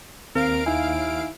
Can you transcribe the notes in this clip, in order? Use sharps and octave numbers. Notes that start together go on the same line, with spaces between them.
D#2 C4 A#4 F5 D7
D#4 E4 G#5